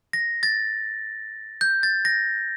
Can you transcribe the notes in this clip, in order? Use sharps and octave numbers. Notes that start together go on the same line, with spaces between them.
A#6
A6
G6
A6
A#6